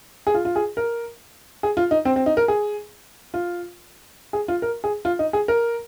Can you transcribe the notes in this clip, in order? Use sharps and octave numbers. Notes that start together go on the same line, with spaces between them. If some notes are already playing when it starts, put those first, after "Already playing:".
G#4
F4
F4
G#4
A#4
G#4
F4
D#4
C4
C4
D#4
A#4
G#4
F4
G#4
F4
A#4
G#4
F4
D#4
G#4
A#4